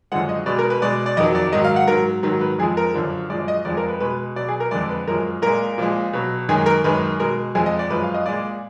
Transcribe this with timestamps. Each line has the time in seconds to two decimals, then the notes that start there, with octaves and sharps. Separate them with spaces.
0.12 F#2 D3 F3 G#3 F#5
0.29 D#5
0.46 B2 G#3 D5
0.59 A#4
0.70 B4
0.82 B2 G#3 D5
1.06 D5
1.17 F2 D#3 F#3 D#5
1.35 D5
1.53 G#2 D#3 F#3 D#5
1.64 F5
1.76 F#5
1.88 G#2 F#3 A#4
2.23 G#2 D#3 F#3
2.41 B4
2.59 F2 F3 G#3 G#4
2.77 A#4
2.94 F#2 D3 F3
3.30 F#2 F3 G#3 D5
3.48 D#5
3.65 F2 F3 G#3 D5
3.77 A#4
3.88 B4
4.00 B2 G#3 B4
4.36 B2 F#3 D5
4.48 G#4
4.60 A#4
4.71 F2 D3 G#3 D5
4.89 B4
5.07 F#2 F3 G#3 A#4
5.42 A#2 G#3 A#4
5.78 A#2 F3 G#3
6.13 B2 F#3
6.49 F#2 D#3 G#3 G#4
6.66 A#4
6.84 F#2 D#3 G#3 B4
7.20 B2 G#3 A#4
7.55 F2 F3 G#3 G#4
7.66 D#5
7.79 D5
7.90 F#2 F3 G#3 B4
8.03 F5
8.14 D#5
8.26 A#2 G#3 D5